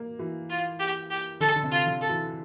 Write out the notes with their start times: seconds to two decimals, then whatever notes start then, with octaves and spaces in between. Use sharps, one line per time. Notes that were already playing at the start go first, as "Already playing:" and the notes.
Already playing: A#3
0.19 E3
0.50 F4
0.80 G4
1.11 G4
1.40 D3 A4
1.56 D3
1.63 C3
1.71 F4
1.86 D3
2.01 A4
2.09 E3